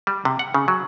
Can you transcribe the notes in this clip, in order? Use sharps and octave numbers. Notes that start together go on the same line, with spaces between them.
G3
C3
F#5
C#3
F#3